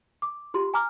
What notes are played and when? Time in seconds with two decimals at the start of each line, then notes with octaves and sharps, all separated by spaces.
0.22 D6
0.54 F4 G4 C6
0.74 G#5 A#5 D6 F6